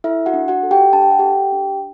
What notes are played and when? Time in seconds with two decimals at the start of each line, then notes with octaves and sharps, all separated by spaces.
0.04 E4 A4 E5
0.26 F#4 F#5
0.34 D4
0.48 F#4 F#5
0.63 A4
0.71 G4 G5
0.93 D4 A5
1.02 G5
1.11 F#5
1.19 G4 A4 G5
1.52 D4